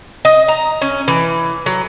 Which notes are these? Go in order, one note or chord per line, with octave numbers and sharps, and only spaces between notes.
D#5
A#5
C#4
E3
F#3